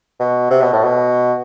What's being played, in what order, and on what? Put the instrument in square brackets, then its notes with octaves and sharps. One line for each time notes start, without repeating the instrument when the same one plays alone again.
[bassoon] B2
C3
B2
A2
B2